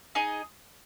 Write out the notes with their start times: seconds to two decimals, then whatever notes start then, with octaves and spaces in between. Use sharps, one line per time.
0.15 D#4 G#4 D#5